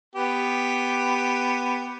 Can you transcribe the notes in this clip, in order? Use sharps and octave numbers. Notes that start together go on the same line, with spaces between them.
B3 G4